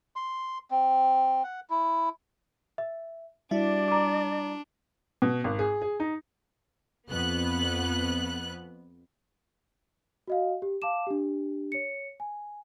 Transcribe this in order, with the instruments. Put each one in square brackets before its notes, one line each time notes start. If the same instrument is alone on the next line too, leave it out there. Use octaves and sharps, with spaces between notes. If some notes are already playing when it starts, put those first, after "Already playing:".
[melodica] C6
C4
F#5
E4
[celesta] E5
[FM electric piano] G3 E4 F#4 [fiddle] D4 [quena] D5 [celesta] E5
[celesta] A#5 D6
[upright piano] B2
G#1
G#4
G#4
D#4
[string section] F2 B3 F#6
[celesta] F#4 D#5 F5
G4
F5 A5 D6 E7
D4 G4
C#5 C#7
G#5